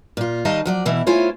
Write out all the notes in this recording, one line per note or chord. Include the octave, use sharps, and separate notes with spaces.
A#2 F4
D#3 G3 D#4 D#5 F5 A5
F3 F#3 D5
B2 E3 E4
A3 E4 F4 C5 C#5 G#5